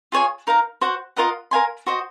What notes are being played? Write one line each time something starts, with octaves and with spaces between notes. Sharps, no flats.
F4 G#4 C#5 G#5
D#4 A#4 F5 A#5
F#4 C5 F#5
F4 A#4 D#5 F#5
A#4 F5 G#5 C6
F#4 C5 D#5